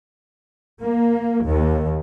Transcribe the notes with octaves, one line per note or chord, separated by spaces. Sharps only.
A#3
D#2